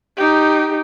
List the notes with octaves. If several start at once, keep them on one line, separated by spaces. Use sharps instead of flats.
D#4 G4